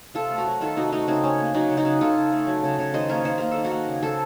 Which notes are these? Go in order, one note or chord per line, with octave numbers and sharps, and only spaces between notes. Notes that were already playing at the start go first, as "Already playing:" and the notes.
C3 F4 A4
A3
F#4 A#4
F#3
D#3 F4 A4
C3 D#4 F#4
A3 D#4 F#4
C#3 C4 D#4
C#3 C#4
A#3
F#3 D#4 F#4
C#3
D#4 F#4
C#3
C#3 F4 A4
C#3
A3
F#3
C#3
C#3
D#3 C5 D#5
A#3 A#4 C#5
D#3 C5
A#3 A#4
D#3 A4
F#4 A#4
A#3
C#3
C#3 A4 C5